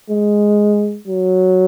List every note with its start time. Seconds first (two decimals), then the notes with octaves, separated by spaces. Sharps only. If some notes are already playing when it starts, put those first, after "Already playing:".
0.10 G#3
1.07 F#3